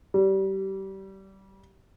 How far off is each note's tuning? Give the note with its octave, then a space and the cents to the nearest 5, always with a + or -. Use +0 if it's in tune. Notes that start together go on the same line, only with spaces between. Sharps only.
G3 -25